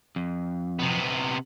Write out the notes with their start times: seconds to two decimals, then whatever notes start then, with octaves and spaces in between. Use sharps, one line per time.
0.16 F2
0.79 C3 B3